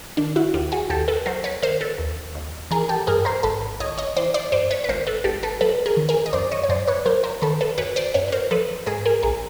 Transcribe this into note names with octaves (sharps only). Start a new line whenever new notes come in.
D#3 D4
E4 F#4
D#2 F4 G4
F#4 G#4
D#2 G4 A4
A4 B4
F#3 A#4 C5
B4 C#5
D#3 A#4 C5
A4 B4
D#2
D#2
E3 G#4 A#4
G4 A4
G2 G#4 A#4
A#4 C5
G#1 A4 B4
G#1 C#5 D#5
C#5 D#5
E3 C5 D5
C5 D5
G2 C5 D5
B4 C#5
B4
G#1 A#4 C5
A4 B4
G#1 G4 A4
A4 B4
F#3 A4 B4
G#4 A#4
D#3
G#4 A#4
D#5
F#2 C5 D5
C#5 D#5
C#5
F#2 C5 D5
B4 C#5
F#3 A#4 C5
A#4 C5
D#3 A4 B4
A4 B4
F#2 B4 C#5
C5 D5
F#2 B4 C#5
B4
A#4 C5
F3 A4 B4
G#2 G#4 A#4
G#4 A#4
A#1 G#4 A#4